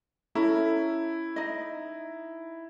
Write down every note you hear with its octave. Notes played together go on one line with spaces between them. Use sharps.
C#4 E4 A4 A#5
D#4 D#5